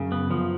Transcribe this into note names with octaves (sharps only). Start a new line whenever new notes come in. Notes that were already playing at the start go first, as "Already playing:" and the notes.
Already playing: F#2 C#3
B3
F#2 F3